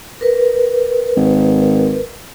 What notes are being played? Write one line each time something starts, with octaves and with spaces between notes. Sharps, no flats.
A#4 B4
G#1